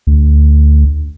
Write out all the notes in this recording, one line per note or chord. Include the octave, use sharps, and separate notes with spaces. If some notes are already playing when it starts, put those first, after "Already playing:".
D2